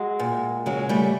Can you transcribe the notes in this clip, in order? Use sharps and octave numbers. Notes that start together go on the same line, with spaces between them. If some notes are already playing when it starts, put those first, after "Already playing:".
Already playing: F#3 G#3
A#2
C#3 F#3 G#3
G3 A3